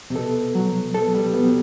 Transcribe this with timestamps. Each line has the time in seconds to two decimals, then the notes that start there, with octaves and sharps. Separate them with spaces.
0.10 C3
0.16 B2 A4
0.55 F#3
0.95 B2 A4
1.14 G3
1.34 G3 B3
1.45 F#3